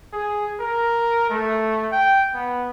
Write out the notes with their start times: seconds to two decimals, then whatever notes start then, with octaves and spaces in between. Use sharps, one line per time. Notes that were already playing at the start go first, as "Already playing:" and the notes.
0.13 G#4
0.60 A#4
1.30 A3
1.92 G5
2.34 B3